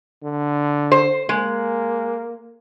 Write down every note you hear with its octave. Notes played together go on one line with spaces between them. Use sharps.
D3
C5
G#3 A#3